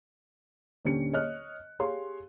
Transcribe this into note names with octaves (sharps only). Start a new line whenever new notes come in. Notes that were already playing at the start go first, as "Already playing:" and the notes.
D#1 D3 C#4 G4 C#7
C#5 D#5 F6 F#6
G4 G#4 C#5 F5 C6